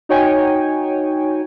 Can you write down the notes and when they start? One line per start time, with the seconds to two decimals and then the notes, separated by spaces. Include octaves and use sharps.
0.09 D#4 F#4 C#5 G5 G#5